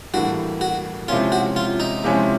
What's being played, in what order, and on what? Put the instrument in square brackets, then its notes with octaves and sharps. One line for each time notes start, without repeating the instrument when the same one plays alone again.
[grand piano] A2 E3 G3 A#3 D4 [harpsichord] F#4
[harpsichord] F#4
[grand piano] C3 F3 G#3 C#4 E4 [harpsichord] F4
[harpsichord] F#4
F4
D#4
[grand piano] C3 F3 G#3 C#4 E4